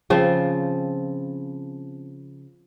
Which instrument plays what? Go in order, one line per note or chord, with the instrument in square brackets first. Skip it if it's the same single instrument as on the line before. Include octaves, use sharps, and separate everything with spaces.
[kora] C#3 F3 C4